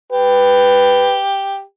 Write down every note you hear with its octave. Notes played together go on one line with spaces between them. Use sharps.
G4 B4